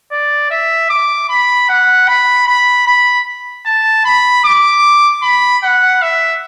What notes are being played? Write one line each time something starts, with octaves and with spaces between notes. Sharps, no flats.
D5
E5
D6
B5
F#5
B5
B5
B5
A5
B5
D6
B5
F#5
E5